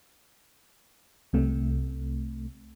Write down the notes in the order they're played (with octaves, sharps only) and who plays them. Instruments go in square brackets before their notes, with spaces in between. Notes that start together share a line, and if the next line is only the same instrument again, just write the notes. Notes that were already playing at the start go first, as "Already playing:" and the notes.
[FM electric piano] C2 C3 A3